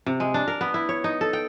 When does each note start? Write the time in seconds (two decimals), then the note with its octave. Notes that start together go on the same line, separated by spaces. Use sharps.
0.06 C3
0.20 G#3
0.34 D4
0.48 A#4
0.61 B3
0.74 E4
0.89 C#5
1.04 D#4
1.21 A4
1.33 G5